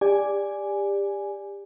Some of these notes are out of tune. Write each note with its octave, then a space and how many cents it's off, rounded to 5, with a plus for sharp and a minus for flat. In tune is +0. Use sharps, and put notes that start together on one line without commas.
G4 +30 D5 +0 G#5 +0